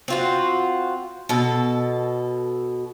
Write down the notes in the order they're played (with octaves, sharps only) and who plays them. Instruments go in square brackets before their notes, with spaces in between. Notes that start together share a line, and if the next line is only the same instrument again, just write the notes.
[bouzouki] C4 F4 F#4
B2 A4